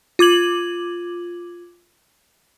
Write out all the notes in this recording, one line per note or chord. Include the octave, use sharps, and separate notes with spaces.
F4 D6 G#6 F#7